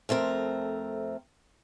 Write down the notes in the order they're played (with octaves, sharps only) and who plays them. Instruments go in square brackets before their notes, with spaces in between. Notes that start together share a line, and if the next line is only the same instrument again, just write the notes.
[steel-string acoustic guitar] F2 A3 C4 A#4